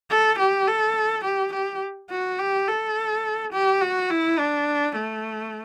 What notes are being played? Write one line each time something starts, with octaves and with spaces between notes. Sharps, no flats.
A4
G4
A4
G4
G4
F#4
G4
A4
G4
F#4
E4
D4
A3